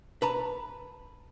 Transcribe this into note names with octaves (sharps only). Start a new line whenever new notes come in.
B4 A5 A#5